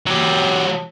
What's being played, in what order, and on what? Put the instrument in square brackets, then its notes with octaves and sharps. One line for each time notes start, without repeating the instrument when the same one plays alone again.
[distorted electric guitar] F#3 G4